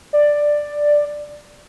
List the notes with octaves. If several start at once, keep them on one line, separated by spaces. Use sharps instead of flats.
D5